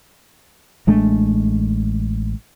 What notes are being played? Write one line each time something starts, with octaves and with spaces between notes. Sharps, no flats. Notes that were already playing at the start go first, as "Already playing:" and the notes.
A1 G#3 A3 D4